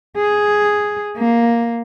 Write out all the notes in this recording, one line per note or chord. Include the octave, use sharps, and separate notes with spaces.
G#4
A#3